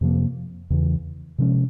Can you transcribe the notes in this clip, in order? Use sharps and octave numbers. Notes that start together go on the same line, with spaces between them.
F2 C3 F3 A#3
E2 C#3 E3
C3 F3 G#3 C#4